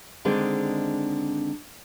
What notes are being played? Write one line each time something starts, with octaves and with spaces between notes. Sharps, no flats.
D3 D#3 G#3 C4 D4